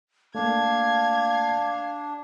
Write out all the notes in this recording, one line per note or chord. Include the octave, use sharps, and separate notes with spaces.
A3 A#3 D4 F5 G#6